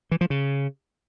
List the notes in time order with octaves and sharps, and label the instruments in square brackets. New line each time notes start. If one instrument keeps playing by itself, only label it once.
[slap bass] E3
F3
C#3